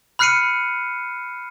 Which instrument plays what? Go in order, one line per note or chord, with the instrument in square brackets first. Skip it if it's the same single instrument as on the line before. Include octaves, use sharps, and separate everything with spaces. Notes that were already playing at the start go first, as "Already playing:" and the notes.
[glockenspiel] B5 F6 F#6 C7 C#7 D#7